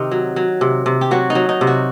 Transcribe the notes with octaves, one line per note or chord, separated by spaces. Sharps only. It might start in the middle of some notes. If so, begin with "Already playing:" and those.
Already playing: C3 D#3 D#4
F#3
F#3
C3
C3
G4
F#3 F#4
D#4
F#3
D#4
C3
F#4